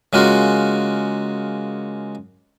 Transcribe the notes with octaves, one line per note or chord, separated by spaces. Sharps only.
C#3 G#3 A#3 F4 F#4